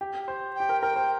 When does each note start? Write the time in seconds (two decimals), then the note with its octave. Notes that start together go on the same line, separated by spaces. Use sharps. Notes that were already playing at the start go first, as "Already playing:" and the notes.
0.01 G4
0.28 C5
0.55 G4 G5
0.69 A#4
0.82 A#4 G5
0.96 C5